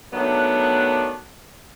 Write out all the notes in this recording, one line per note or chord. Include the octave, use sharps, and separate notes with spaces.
D#3 F#3 A3 B3 D4